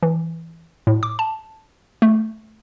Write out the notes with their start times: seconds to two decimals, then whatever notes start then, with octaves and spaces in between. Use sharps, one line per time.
0.03 E3
0.87 A2
1.03 D6
1.19 A5
2.02 A3